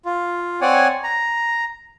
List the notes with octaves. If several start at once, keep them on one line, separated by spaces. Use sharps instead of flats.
F4
C4 C#5 D5 F#5 G#5
A#5